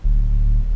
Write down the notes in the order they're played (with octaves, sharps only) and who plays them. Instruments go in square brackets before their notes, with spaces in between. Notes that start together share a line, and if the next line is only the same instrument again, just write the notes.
[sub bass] D1